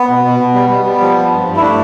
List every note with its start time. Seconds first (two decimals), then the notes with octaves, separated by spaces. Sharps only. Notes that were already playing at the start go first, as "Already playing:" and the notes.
Already playing: B3
0.09 B2
0.25 B2
0.40 B2
0.54 G3
0.69 G3
0.85 G3
1.00 F3
1.16 F3
1.31 G2
1.45 G2
1.57 E4
1.61 A3 D4